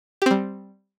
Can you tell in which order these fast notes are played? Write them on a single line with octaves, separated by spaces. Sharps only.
G4 C4 G3